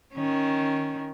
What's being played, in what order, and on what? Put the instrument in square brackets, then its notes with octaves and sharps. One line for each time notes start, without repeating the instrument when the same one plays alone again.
[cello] D#3 C#4